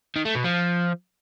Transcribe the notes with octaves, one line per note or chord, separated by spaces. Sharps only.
D#3
A3
B2
F3